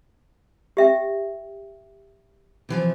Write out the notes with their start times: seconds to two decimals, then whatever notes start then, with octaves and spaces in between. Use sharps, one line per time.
0.77 G4 E5 G5
2.69 C3 E3 F3